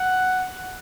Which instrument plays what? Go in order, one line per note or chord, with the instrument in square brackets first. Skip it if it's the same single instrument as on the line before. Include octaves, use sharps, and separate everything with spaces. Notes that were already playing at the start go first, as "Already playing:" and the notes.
Already playing: [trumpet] F#5